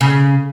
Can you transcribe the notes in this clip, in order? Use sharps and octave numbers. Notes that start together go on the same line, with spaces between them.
C#3